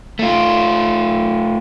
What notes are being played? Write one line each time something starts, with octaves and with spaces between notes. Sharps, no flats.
A3 F4